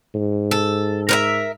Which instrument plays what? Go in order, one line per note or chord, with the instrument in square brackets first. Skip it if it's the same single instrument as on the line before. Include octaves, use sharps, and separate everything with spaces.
[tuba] G#2
[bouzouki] A4
A#4 B4 E5